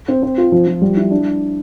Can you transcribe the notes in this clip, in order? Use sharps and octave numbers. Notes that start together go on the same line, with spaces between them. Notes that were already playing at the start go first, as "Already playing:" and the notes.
C4
C4
F4
F3
F3
G3
E4
D4